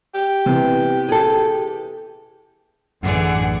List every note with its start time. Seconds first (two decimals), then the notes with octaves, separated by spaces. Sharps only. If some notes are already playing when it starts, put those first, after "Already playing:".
0.14 G4
0.46 C3 E3 B3
1.09 G#4 A4
3.03 A1 F#2 A2 D3 E3 G#4 D5 F#5